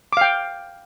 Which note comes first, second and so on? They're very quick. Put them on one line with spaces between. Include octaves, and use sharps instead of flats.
D6 F5 G5